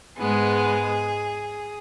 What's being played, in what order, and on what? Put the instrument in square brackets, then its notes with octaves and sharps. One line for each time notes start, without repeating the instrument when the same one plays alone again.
[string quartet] G#2 G#3 B3 G#4